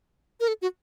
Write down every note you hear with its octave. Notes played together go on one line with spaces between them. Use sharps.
A#4
A4
F#4